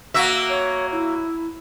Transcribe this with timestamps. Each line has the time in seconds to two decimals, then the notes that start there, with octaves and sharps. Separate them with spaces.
0.14 A#3 F#4 E5
0.49 C#5
0.92 E4